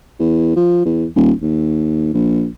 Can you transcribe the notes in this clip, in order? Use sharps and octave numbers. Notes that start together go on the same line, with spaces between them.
E2
F3
E2
D#1
D#2
A#1